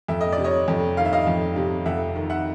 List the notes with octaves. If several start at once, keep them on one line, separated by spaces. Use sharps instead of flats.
F2 E5
D#5
D5
C3
C#5 D#5
F2
D#3 F5
E5
D#5 F5
F2
C3
F2 E5 F#5
D#3
E5 F#5